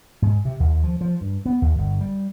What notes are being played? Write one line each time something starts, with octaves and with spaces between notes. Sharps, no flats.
G#2
C3
D#2
F3
F3
G2
B3
D#2
G1
G3